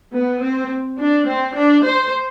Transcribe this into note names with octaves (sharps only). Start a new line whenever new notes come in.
B3
C4
D4
C4
D4
C5